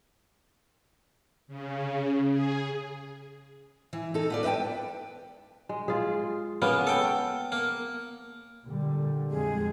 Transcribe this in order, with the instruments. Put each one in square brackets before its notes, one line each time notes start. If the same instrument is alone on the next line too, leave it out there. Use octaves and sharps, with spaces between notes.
[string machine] C#3
G#4
[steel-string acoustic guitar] E3
D#4 A4
B3 F4 D5
B4 D#5 E5 G5 A5
[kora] G#3
F4 G#4
[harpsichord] C#3 A#3 [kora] B3
[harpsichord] A4 G5
A#3
[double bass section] A#2 D3 G3
[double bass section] F2 F3 G#3 [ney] G#4